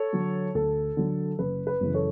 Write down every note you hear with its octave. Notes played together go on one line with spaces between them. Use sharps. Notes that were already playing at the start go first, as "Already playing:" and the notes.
Already playing: A4 C#5
D3 F#3
D2 A4
D3 F#3
F#1 B4
B4
F#2 C#3 E3
A4 C#5